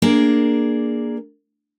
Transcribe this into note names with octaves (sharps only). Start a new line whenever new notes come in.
A#3 D4 G#4 A#4